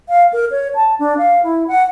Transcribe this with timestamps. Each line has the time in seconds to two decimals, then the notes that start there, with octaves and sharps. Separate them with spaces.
0.09 F5
0.33 A#4
0.51 C#5
0.75 A5
0.99 D4
1.18 F5
1.43 E4
1.68 F#5